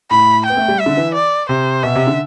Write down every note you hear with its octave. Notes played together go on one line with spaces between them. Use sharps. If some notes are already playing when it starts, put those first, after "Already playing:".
A2 B5
B3 G5
A3
G3
E5
D3
E3
D5
C3 C5
B2 E5
C3
D3